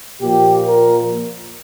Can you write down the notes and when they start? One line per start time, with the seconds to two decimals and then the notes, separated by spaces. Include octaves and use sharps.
0.22 A#2 F3 G4
0.66 A#4